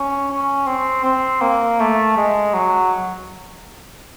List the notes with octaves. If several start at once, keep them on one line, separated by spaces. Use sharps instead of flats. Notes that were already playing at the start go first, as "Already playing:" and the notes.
Already playing: C#4
C#4
C4
C4
A#3
A3
G#3
F#3